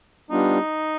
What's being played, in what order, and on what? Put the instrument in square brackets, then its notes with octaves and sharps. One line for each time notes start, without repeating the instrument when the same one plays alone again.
[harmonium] G3 B3 D4 F4 [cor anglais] D#4